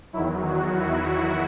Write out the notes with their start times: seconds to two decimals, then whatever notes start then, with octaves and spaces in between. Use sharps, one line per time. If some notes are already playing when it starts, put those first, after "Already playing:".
0.13 E2 D#3 F#3 E4
0.45 F#4
0.77 E4